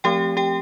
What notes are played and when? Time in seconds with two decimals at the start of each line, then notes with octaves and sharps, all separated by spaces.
0.04 F3 A3 C4 G4 G5
0.37 G4 G5